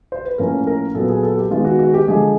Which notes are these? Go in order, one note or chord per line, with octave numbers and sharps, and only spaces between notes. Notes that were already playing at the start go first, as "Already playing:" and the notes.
C5
B4
A2 F3 A#3 C#4 A#4
A#4
A#2 F#3 B3 A4
G#4
A4
G4
D#3 G#3 B3 F4
F#4
F#4
G4
D3 F3 G#3 G#4